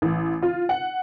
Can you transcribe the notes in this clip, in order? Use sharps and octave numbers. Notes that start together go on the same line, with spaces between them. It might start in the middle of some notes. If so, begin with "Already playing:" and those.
A1
F4
F#5